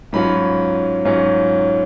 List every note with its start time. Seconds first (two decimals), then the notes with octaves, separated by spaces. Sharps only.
0.13 G#2 F#3 C#4 F4 B5
1.05 G#2 F#3 C#4 F4